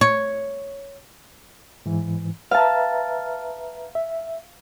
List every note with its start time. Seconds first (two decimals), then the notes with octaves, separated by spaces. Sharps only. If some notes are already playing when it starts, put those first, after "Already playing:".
0.01 C#5
1.86 G#2 E3
2.51 B4 E5 F5 A5 A#5
3.95 E5